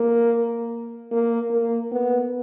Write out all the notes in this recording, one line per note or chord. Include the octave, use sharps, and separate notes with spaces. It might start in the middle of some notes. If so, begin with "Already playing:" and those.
Already playing: A#3
A#3
A#3
B3